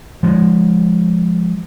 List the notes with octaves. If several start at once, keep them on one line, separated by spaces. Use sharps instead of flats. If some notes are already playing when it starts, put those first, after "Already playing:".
F3 G#3